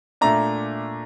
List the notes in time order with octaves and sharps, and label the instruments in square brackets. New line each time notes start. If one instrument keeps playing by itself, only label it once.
[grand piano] A#2 A3 D4 A#5